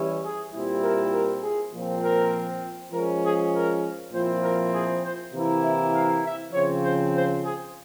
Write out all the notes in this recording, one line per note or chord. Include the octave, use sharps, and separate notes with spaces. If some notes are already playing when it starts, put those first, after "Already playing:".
Already playing: E3 G3 C#4 E4
G#4
A#2 G3 C4 E4
A#4
A#4
G#4
A#2 F3 C4
A#4
F3 G#3 C#4 A#4
G#4
A#4
A#2 F3 C4 E4 C5
A#4
G#4
C5
C3 E3 A#3 E4
E5
F5
E5
C#3 F3 C4 C#5
C5
C5
G#4